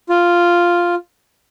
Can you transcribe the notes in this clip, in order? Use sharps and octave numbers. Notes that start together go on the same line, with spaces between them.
F4